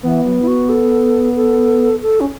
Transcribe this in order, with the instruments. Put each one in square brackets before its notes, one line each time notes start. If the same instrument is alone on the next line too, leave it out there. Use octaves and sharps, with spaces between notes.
[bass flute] E3 [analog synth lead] B3
[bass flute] F#3
E4
F#4
A4
A4
A4
C#4